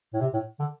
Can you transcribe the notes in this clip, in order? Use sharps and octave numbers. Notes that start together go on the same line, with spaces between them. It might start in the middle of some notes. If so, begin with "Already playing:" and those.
A2
C3
A2
D3